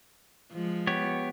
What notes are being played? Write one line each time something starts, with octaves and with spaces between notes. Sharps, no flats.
F3 G#3
B3 G4 C#5